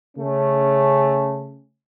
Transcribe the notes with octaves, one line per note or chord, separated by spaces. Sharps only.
C#3 A3 C#4